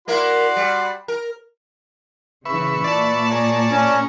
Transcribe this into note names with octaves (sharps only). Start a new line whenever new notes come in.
A#3 E4 F#4 A#4 D5 C6
G3
A#4
C#3 E3 B4 E5 C#6
A#2 D5 A5
G#4 A#4 C#5
C#4